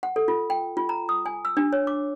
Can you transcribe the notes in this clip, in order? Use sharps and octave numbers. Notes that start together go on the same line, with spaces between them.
F#5
A4
F4
G5
F4
A#5
D#6
G#5
E6
D4
C#5
D6